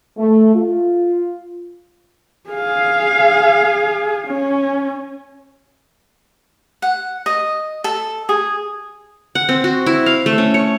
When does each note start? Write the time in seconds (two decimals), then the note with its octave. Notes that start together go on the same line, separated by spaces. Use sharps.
0.18 A3
0.54 F4
2.50 G#4 F5
4.27 C#4
6.82 F#5
7.26 D#5
7.84 A4
8.29 G#4
9.35 F#5
9.49 C4
9.64 F#4
9.86 E4
10.06 F5
10.26 A3
10.38 C#4
10.54 C#5